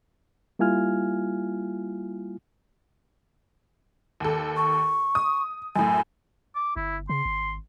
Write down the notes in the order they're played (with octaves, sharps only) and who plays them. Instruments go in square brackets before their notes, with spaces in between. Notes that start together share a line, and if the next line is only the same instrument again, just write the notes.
[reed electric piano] G3 A#3 E4 F4 G#5 F6
[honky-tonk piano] D#2 A4
[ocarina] C#6
[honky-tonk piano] D#6
[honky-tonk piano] F#2 A2 [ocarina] G#5
[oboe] D6
[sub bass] G1 [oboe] E4
[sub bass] C#3 [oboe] C6
[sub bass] G#1